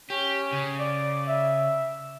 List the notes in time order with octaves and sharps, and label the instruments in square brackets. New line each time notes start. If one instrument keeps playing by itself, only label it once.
[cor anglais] C#4 [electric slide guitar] G4
[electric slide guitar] C#3
[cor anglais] D5
E5